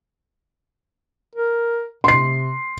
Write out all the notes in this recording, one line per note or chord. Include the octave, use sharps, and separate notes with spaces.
A#4
C3 C6 C7